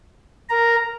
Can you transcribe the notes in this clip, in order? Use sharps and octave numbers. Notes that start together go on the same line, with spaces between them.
A#4 A#5